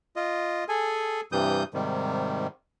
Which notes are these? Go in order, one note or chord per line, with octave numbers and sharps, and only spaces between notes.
F4 D#5
G#4 A4 G#5
G2 C3 E3 G3 D#6 G6
G#2 C3 D#3 G3